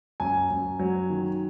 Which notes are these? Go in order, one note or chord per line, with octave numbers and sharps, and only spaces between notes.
F#2 G#5
F#2
F#3
D#3